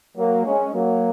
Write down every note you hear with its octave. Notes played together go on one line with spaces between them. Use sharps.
F#3 A#3
G#3 C#4
F#3 A#3